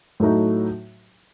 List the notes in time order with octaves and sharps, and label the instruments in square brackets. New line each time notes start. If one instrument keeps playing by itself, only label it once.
[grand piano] A2 F#3 A3 D#4 F#4